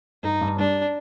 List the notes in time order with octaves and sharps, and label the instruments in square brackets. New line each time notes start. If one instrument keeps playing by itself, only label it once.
[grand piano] G2 [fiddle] D#4
[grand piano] G2
[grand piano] G3 [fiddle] D4